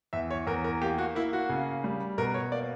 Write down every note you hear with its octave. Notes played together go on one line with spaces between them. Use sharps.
E2 E5
C#5
E2 A#4
A#4
A#3 G4
F#4
A#3 E4
F#4
C#3
G3
B2 A#4
C#5
A#3 D5